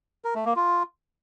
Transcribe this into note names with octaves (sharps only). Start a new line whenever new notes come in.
A#4
A3
A#3
F4